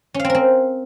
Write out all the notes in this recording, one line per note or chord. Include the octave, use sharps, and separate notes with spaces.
C#4
F5
C4
A#4
C4